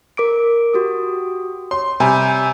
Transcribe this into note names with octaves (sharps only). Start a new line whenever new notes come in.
A#4 D6 D7
F#4 G4 D#6
C#5 C6
C3 G3 G#5 A#5 G6